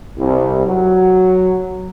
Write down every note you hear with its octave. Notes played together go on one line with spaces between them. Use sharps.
C2
F#3